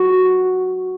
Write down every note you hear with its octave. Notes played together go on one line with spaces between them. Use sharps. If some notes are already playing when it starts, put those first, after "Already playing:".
Already playing: F#4